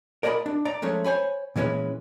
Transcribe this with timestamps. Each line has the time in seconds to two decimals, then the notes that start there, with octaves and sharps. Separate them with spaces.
0.23 A#4 D5 D#5 A5 B5
0.46 D4
0.65 D5 A#5
0.82 F3 G#3 A3 C#4
1.04 C5 C#5 G#5 B5
1.56 A#2 E3 G#3 C#4 B4